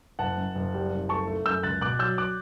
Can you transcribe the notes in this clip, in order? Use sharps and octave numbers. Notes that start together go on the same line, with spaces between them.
F#1 F#5 A5
F#2
F#1
G3
F#1
A3 A5 C#6
A3
F#2 E6 G6
C#2 F#6 A6
B2 D6 F#6
F#3 E6 G6
D6 F#6